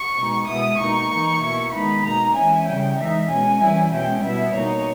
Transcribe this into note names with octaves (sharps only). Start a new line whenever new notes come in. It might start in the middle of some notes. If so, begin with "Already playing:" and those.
Already playing: C#6
B2 G#3 D#4
B2 G#3 B3 E4 D#6
B2 A#3 D#4 C#6
E3 A#3 D#4
B2 A#3 E4
D#3 G#3 B3 D#4 B5
B2 A#3 D#4 A#5
E3 G#3 C#4 E4 G#5
C#3 G3 C#4 G5
E3 G#3 D#4 E5
B2 G#3 C#4 G#5
E3 G3 C#4 E4
B2 G#3 C#4 E4 G5
B2 G3 B3 E4 E5
B2 A#3 D#4 C#5